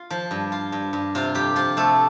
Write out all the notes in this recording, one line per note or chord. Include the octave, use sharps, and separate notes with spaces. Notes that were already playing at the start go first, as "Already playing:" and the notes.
Already playing: F4
F3
G2
F4
G2
G2
C3 F4
F2 G4
F3 F4
C3 A3 A4